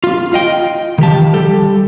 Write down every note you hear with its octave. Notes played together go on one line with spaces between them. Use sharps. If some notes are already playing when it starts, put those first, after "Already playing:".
F4
F4 D#5 G5
D#3 F3 G4 A5
G3 G4 A4